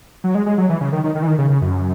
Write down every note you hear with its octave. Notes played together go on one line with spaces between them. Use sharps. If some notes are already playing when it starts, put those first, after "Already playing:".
F#3
G#3
G#3
F#3
E3
C#3
D#3
D#3
D#3
E3
D#3
C#3
C#3
F#2